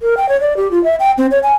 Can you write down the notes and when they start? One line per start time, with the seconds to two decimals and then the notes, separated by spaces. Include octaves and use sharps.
0.02 A#4
0.17 G5
0.29 C#5
0.41 D5
0.57 G4
0.71 F4
0.84 E5
1.00 G5
1.18 C4
1.31 C#5
1.43 G#5